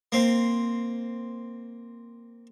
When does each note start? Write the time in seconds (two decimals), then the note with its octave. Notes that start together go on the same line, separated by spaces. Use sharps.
0.12 A#3 C4